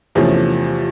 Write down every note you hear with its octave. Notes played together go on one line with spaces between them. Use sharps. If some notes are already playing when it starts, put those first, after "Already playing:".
E2 C3 F3 A3 C#4